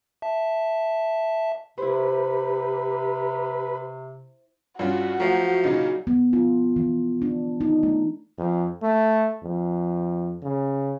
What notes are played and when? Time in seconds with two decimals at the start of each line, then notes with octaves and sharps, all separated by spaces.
0.22 E5 A5
1.78 C3 E4 G4 B4 C5
4.79 G2 C#4 F4 F#4
5.20 F3 F#3 A3 G#5
5.64 A#2 C#3 D#4
6.07 B3
6.33 F4
6.76 E3
7.22 D4
7.61 D#4
7.83 A3
8.38 F2
8.82 A3
9.43 F2
10.43 C#3